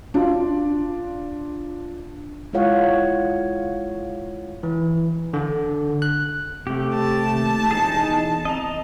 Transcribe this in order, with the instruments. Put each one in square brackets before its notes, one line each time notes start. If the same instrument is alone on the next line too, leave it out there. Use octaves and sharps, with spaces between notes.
[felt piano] D4 F4
[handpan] G#3 E4 F4 C#5 F5 F#5
[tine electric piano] E3
D3
F#6
[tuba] C3 [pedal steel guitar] A3 G4
[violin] A5
[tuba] D#2
[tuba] E1 [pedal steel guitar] D#4 G#4
[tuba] E2
[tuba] C4 [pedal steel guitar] D#5 A#5